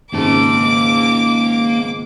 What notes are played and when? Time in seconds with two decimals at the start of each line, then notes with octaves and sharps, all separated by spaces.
0.13 G#1 C#2 A#3 A5 D6